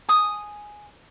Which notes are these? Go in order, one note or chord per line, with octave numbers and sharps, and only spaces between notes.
G#5 D#6